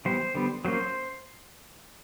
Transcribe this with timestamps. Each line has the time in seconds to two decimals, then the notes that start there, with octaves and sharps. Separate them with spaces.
0.05 E3 G3 B3 C5
0.35 D3 G3 B3
0.65 F#3 A#3 C#4 C5